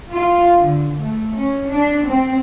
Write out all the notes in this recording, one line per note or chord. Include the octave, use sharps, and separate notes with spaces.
F4
D3
A3
C#4
D4
C4